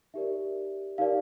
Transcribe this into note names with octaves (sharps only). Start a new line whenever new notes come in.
D#4 G4 A#4 D5 E5
D#4 G4 A#4 D5 F5